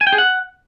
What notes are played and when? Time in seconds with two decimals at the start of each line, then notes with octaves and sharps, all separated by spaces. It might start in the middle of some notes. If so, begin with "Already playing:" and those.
0.01 G#5
0.07 G5
0.12 G#4
0.18 F#5